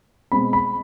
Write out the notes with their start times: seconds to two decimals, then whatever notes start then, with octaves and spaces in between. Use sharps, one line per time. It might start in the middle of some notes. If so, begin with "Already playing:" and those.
0.32 B2 G#3 C4 B5
0.53 B5